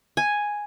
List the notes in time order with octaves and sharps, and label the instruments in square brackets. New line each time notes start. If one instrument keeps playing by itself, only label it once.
[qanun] G#5